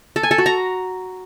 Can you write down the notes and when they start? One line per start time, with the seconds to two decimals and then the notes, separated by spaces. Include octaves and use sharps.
0.16 A4
0.23 G#5
0.31 A4
0.38 F#4
0.46 A#5